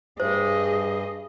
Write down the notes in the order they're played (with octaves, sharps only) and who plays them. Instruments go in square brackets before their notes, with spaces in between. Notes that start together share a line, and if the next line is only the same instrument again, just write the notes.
[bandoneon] G2 [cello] G#4 D#5 [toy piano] C5